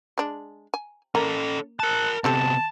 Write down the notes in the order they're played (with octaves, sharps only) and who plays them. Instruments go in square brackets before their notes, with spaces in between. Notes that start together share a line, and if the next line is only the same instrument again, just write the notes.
[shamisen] G#3 D4
G#5
[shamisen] A#3 [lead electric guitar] C#4 A4
[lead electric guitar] A#4 A5 [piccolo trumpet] F#6
[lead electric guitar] C3 B3 [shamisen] C4 G4 A4 [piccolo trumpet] A5